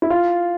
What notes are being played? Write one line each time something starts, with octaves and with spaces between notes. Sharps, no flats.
E4
F4